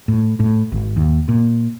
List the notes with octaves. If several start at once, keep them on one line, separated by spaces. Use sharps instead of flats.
A2
A2
G#1
D#2
A#2